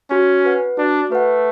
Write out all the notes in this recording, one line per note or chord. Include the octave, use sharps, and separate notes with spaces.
C#4 F#4
B4 F#5
D4 F#4
A3 B4 F#5